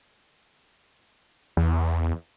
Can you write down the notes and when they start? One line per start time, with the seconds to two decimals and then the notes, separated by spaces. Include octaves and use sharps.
1.57 E2